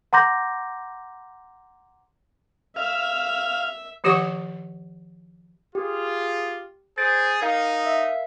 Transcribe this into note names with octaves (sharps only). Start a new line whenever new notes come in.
F#5 A#5 C6 D6 G6 A#6
E5 F5
D#3 F3 G4 C#5 F#5 C#6
F4 G4 G#4
G#4 C5 A6 D7
D#4 A#4 F5 D#6
E5